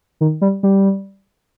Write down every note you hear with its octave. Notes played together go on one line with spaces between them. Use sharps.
D#3
G3
G3